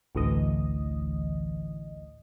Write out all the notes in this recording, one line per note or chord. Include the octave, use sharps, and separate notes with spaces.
A1 D2 E3 D#5